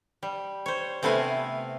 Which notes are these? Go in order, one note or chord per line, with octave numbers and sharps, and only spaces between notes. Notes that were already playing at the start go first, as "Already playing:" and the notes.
G3
C5 C#5
C3 A3 B3 E4 F5 G#5